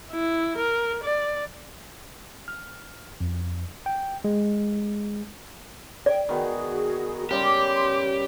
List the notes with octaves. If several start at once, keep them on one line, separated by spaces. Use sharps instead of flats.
E4
A#4
D5
F6
F2
G5
G#3
D5 G5
D#3 B3 F#4 G#4
C#3 G3 G4 C6 D6